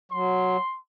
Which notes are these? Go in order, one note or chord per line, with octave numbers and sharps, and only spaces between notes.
F#3 C6